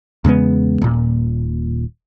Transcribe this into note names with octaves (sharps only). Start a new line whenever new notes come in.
E2 C#3 G#3 B3
D#1 A#2